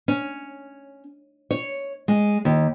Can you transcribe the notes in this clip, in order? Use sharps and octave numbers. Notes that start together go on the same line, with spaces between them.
C#4
C#5
G#3
D#2